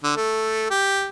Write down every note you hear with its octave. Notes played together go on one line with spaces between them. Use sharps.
D3
A3
G4